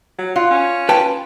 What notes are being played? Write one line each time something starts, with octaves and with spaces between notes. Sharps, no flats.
F#3
F4 F#5
C#4
B4 G5 A5